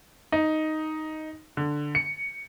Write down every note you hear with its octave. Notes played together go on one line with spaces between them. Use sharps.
D#4
D3
C#7